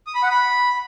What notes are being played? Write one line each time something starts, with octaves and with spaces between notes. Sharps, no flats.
D#6
B5
F#5
B5